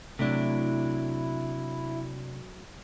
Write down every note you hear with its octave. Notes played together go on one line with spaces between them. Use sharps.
C3 F#3 A3 D4 E4